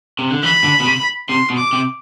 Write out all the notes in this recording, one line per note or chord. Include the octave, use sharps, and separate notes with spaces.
C3
D3
E3 B5
D3
B2
C3
C3 C6
B2
D6
C3